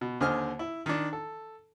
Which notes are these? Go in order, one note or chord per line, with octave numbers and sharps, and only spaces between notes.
B2
D#2 D3 C5 D#5 G#5 F6
E4
D#3 D4
A4